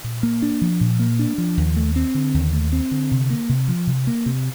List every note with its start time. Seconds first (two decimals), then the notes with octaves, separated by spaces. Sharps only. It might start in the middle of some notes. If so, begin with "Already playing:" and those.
0.04 A#2
0.23 A#3
0.42 D4
0.61 F3
0.81 A#2
0.99 A#3
1.19 D4
1.38 F3
1.57 D#2
1.76 A3
1.96 C4
2.15 D3
2.34 D#2
2.53 A3
2.73 C4
2.91 D3
3.11 C3
3.30 A#3
3.49 C3
3.68 F3
3.87 C3
4.07 A#3
4.26 C3